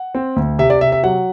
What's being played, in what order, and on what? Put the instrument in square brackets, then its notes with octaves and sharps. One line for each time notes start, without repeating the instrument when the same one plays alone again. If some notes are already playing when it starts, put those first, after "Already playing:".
Already playing: [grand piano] F#5
C4
D2
C3 E5
D5
C3 E5
E5
F#3 F#5